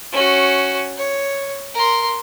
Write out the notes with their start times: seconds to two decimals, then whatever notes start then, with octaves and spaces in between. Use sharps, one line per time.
0.12 C#4 F#4
0.97 C#5
1.74 A#4 C6